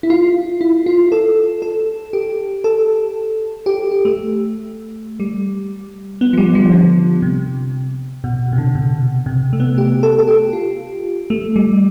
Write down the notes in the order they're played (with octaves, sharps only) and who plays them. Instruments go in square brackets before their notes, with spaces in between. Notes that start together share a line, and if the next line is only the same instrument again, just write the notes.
[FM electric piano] E4
F4
E4
F4
A4
A4
G4
A4
G4
G4
A3
G3
B3
F3
G3
F3
D3
C3
B2
C3
D3
B2
C3
A3
B3
G4
A4
A4
G4
F4
A3
G3